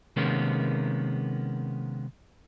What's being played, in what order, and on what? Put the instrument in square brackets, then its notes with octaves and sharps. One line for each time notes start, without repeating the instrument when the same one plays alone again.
[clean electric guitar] C3 D#3 G#3 A#3 B3 C#4